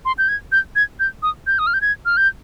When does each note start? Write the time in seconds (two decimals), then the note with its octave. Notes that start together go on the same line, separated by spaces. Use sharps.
0.05 C6
0.18 G6
0.28 G#6
0.52 G6
0.76 G#6
1.00 G6
1.23 D#6
1.47 G6
1.59 D#6
1.67 F6
1.74 G6
1.81 G#6
2.05 F6
2.17 G6